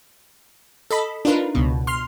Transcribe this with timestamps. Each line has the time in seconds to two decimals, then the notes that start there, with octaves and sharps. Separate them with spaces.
0.91 A4 D#5 B5
1.25 D4 D#4 F4 A#4 B4
1.55 C#2 B2
1.87 C6 F6